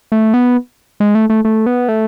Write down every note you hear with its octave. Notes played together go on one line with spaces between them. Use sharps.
A3
B3
G#3
A3
A3
A3
B3
A3